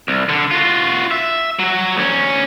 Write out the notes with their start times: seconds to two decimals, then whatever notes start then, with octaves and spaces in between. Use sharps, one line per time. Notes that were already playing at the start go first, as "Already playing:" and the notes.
0.08 C2
0.29 D3
0.51 F4 F#4
1.11 E5
1.59 F#3 F#4
1.97 D2 C#4